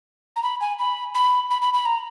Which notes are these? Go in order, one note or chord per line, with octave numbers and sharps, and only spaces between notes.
A#5
B5
G#5
B5
B5
B5
B5
B5
A#5